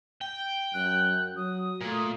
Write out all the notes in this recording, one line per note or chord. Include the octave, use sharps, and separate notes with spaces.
G5
F#2 F#6
F#3 D#6
A#2 A3